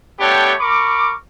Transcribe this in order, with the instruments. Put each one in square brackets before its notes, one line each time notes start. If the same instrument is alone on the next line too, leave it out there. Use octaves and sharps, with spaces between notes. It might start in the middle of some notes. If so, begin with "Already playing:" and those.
[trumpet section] A3 B3 D4 G4 C#5 G5
A#4 B5 C#6 D6